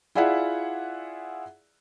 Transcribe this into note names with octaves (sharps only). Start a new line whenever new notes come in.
E4 F4 G#4 D5 E5 F#5